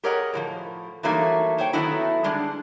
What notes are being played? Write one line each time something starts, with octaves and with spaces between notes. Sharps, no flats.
G4 G#4 A#4 C#5 D#5 F#5
A2 E3 F3
E3 F#3 G3 A3 A#3 D#4
C5 C#5 G5
D#3 F#3 A3 B3 D#4 E4
D3 G3 G#3 D4